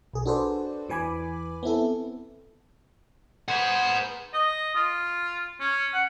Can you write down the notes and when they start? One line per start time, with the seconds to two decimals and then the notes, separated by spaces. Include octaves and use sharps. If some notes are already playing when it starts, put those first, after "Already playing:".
0.14 B1 G#4
0.26 D4 F#4 A4 B4 C5 D5
0.89 E2 E3 B4 G#5 B5 D6
1.63 B3 C4 E4 A4
3.48 G#4 B4 C5 F#5
4.33 D#5
4.75 F4
5.60 C#4
5.93 F#5